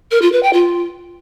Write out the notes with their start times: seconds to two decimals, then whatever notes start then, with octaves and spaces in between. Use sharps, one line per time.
0.11 A#4
0.22 F4
0.32 B4
0.43 G5
0.53 F4